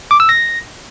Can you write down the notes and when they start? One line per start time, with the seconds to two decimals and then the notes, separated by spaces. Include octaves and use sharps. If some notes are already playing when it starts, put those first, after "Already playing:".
0.11 D6
0.20 E6
0.29 A#6